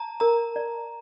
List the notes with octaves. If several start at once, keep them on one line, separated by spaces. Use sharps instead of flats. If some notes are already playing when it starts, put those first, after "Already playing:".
Already playing: A5 A#5
A#4 A#5
D5